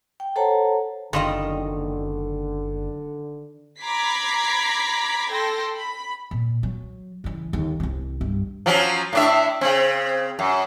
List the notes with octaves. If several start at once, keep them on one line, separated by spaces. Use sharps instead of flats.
G5
A4 C5 C#5 F#5 A5 A#5
F#1 D3 D#3 G3 F4 D#5
A#5 B5 D6 G#6 B6 C7
A4 G5 C6 A#6
B5
A#2
F#3
C#3 E3
D#2 D3
C2 C4
G2
F3 F#3 C#4
A2 D4 E5
C#3 C4
F#2